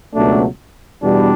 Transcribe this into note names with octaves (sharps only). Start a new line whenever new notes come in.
C#2 B2 F#3 A3 D4
E2 B2 G3 D4